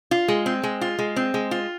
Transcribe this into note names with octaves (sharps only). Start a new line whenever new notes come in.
F4
G#3
C4
G#3
F4
G#3
C4
G#3
F4